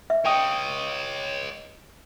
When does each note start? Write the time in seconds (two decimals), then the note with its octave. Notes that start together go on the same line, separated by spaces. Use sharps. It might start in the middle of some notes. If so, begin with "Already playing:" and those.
0.10 E5
0.25 C#5 D#5 G5 D#6